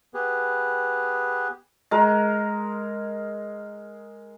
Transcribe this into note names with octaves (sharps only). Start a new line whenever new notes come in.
B3 G4 G#4 B4
G#3 A#4